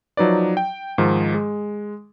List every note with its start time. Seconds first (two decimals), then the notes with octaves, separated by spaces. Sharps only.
0.17 F3 F#3 D#4 B4 D5
0.57 G5
0.98 G#2 D#3 F3
1.34 G#3